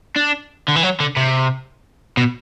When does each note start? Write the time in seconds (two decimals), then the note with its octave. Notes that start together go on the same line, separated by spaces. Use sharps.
0.16 D4
0.68 D3
0.76 E3
0.83 F#3
1.00 D3
1.17 C3
2.17 B2